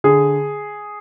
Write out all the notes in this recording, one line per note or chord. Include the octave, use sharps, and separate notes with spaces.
D3 G#4